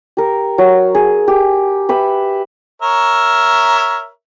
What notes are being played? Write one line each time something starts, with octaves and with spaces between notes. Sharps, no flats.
G4 A#4
F#3
G#4
G4
G4 B4 E5
A#4 C#5 E5